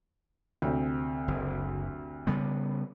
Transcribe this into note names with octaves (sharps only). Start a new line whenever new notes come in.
D2 C3 C4
F#1
C#3 G3 B3